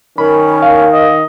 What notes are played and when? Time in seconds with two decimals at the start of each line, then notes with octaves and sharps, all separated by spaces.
0.18 D#3 C#4 A#4 B5
0.62 F5
0.92 D#5